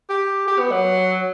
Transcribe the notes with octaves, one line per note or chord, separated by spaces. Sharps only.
G4
G4
B3
F#3